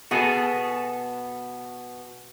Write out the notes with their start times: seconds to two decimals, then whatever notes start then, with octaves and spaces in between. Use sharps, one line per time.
0.11 B2 B3 F#4 G#4 A4